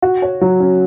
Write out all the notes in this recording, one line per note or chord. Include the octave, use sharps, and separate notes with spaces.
F#4
C#5
F#3
C#4